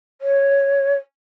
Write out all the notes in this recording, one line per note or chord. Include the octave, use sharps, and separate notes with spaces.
C#5